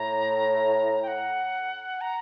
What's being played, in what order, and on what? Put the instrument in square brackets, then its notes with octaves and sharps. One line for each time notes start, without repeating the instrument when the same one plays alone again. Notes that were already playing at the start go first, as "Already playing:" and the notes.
Already playing: [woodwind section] A2 [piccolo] A#5
[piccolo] G5
F#5
A#5